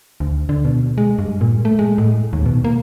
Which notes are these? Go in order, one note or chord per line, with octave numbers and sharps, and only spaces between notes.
D2
D3
B2
G#3
G2
A#2
A3
G#3
A2
D#2
B2
A#3